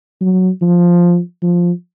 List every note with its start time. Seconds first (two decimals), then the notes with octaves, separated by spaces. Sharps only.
0.21 F#3
0.62 F3
1.43 F3